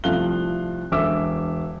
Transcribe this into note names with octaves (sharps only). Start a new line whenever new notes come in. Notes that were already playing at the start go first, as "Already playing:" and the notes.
C2 F3 A3 F5 F#6 G7
E1 D3 E5 D6 E6